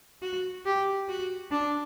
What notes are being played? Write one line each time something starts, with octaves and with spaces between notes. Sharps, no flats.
F#4
G4
F#4
D4